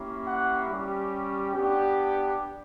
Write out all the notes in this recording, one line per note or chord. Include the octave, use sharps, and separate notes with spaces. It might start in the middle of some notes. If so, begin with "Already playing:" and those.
Already playing: A#3 C#4 E4 G4
F#5
G3 C#4 G4
B3 D4 G4